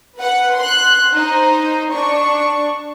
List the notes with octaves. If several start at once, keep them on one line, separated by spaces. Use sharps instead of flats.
B4 F#5
C6 F#6
D#4 C5
D4 C#6